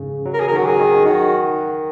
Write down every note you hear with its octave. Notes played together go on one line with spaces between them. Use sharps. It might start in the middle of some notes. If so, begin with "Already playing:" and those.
Already playing: G#2 C#3
F#3
A#4
G#4
D#3 F#3 A#4
F#4
G#4
D#3
D#3 F#4